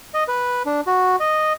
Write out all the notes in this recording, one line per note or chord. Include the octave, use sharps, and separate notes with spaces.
D#5
B4
D4
F#4
D#5